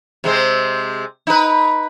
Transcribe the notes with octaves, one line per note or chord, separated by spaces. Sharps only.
C3 G#3 C4
D#4 B4